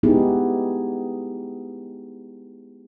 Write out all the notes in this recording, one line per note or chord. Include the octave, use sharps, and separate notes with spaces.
G#3 B3 D#4 E4 G4 G#4